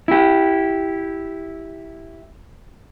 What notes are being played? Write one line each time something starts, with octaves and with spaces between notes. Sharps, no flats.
E4 G4